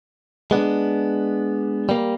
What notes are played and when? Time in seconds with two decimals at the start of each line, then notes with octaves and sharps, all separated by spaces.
0.51 G#3 B3 D4
1.89 G3 A#3